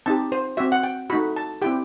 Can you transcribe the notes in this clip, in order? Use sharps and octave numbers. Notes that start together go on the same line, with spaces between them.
C4 D#4 G4 A5
C5
C4 F#4 E5
F#5
G5
A3 D#4 F#4 B5
A5
C4 E4 G4 G5